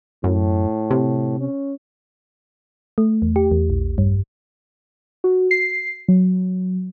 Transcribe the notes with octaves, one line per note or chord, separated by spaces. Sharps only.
F#2 A2
C3
C#4
A3
E2
G4
E2
A#1
G2
F#4
C7
F#3